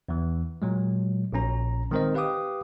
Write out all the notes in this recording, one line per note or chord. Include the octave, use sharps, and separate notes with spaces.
E2 E3
A#2 F#3 G#3
A#1 A#2 C#4 A#5
D#3 G#3 C4 A#4 C5 D#5
G4 B4 F5 G5 D6 D#6